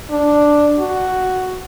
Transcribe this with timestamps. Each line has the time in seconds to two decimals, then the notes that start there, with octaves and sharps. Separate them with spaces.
0.10 D4
0.79 F#4